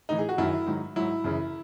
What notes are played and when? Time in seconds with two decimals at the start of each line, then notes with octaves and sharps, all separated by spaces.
0.09 A2 E3 D#4
0.19 G#4
0.29 F#4
0.38 F#2 D#3 F#3 E4
0.66 G#2 D#3 F#3
0.96 G#2 F#3 E4
1.24 F#2 C#3 E3